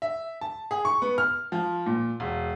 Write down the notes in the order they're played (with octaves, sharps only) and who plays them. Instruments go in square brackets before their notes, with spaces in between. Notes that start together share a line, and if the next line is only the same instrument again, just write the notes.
[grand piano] E5
A5
G#4
C#6
B3
F6
F3
A#2
E1